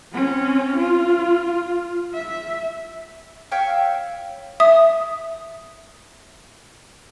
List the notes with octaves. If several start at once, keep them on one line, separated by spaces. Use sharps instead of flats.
C4 C#4
F4
F4
E5
C#5 E5 F5 G5
E5 D#6